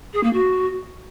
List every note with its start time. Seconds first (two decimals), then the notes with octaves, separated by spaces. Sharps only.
0.14 G#4
0.23 A#3
0.33 F#4